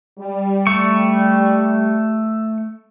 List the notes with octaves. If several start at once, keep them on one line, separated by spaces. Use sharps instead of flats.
G3
A3 C#6